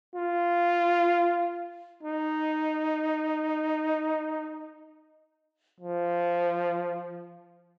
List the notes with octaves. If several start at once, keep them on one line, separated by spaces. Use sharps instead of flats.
F4
D#4
F3